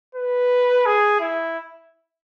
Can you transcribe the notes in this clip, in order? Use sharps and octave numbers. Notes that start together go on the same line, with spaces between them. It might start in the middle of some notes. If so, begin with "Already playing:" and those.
B4
G#4
E4